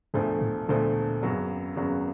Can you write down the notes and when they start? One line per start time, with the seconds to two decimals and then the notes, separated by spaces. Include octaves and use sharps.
0.14 E1 D2 G#2 D3 F3 A3
0.41 A2
0.69 E1 D2 A#2 D3 F3 A3
1.22 G#1 F#2 C#3 F#3 B3
1.76 G#1 F#2 C#3 F#3 B3